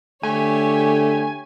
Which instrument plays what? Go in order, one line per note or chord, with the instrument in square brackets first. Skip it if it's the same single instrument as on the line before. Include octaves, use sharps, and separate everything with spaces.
[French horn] D3 [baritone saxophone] A3 [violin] G4 C#5 [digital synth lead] G#5